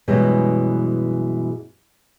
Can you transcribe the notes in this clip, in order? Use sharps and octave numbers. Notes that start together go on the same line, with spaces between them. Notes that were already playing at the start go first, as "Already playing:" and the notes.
F#2 B2 E3 G3 G#3